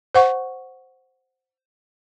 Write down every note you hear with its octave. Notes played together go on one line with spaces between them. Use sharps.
C5 F#5 C#6